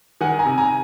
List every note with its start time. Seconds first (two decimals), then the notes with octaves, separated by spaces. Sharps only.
0.21 D#3 F#5 G#5
0.39 G#5 A#5
0.46 C3
0.58 G#5 A#5